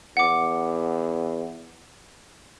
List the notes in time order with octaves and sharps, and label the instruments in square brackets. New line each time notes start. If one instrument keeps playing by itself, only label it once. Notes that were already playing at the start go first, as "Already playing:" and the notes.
[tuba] E2 [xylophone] F#5 D6